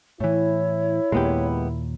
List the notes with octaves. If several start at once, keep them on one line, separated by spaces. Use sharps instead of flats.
A2 E3 E4 C#5
D#2 A#2 G#3 B3 G4